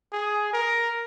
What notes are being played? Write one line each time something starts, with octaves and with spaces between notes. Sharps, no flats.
G#4
A#4